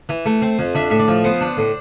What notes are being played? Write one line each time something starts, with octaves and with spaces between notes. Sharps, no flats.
E3
A3
C4
F2
D4 E5
A2 E5
D5
F3
B3 C5
D4
A2